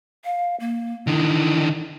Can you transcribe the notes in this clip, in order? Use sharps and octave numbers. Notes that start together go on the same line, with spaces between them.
F5
A#3
D3 D#3 E4